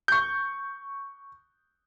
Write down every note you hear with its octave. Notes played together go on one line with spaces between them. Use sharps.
C#6 G6